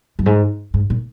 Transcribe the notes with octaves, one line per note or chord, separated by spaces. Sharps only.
F#2
G#2
G#2
A#2